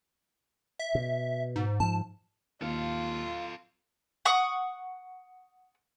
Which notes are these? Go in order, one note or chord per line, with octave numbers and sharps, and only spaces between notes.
E5
B2
G#2
G#2 F3 A5
D#2 F4 A4 F5
F#5 C#6 D#6